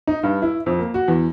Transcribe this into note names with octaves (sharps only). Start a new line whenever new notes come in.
D#4
G2
E4
F2
A#3
F#4
E2